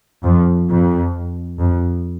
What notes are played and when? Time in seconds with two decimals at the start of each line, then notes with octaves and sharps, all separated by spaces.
0.24 F2
0.69 F2
1.59 F2